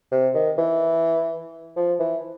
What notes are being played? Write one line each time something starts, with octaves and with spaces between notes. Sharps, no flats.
C3
D#3
E3
F3
E3